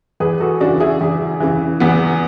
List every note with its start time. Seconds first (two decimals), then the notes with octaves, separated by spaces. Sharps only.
0.20 E2 G#4 B4
0.40 F#4 A4
0.61 C#3 E3 D4 F#4
0.80 E4 G#4
1.01 E2
1.40 C#3 E3
1.80 E2 B3